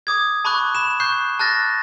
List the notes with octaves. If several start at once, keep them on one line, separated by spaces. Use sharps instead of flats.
D6 D#6 G#6
A5 B5 C#6 D6 F#6
B5 E7
C#6 F#6 G6 C7
A5 F6 F#6 A6 A#6